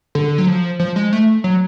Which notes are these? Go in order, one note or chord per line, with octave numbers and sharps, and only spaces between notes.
D3
F#3
F3
F3
G#3
A3
F#3